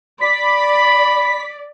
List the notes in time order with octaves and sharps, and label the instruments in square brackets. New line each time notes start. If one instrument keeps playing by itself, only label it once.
[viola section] D5 [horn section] B5 [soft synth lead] B6